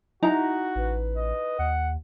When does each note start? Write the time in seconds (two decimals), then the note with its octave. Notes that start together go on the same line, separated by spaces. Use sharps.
0.23 D#4 E4 F#4 A#5
0.75 A1 B4
1.17 D#5
1.59 D#2 F#5